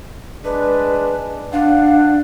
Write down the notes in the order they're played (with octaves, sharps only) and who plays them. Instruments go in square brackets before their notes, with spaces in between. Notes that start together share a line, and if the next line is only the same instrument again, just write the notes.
[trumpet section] G#3 D4 [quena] B4
[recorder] D4 [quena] F5 [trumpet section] F#5